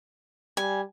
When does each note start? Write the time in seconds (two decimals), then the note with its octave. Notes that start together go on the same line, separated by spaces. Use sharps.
0.57 G3 G#5